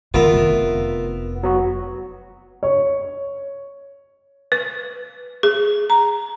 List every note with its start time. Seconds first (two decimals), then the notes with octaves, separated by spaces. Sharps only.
0.14 F2 D#3 B3 F4 A#4 E5
0.33 F1
1.43 F#3 B3 F#4
2.63 C#5
4.52 B4
5.43 G#4
5.90 A#5